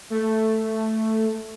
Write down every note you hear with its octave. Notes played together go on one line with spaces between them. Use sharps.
A3